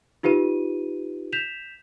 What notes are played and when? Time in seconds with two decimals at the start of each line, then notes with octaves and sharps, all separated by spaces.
0.23 D#4 F4 G4 B4 D#7
1.33 G6 B6 E7 F7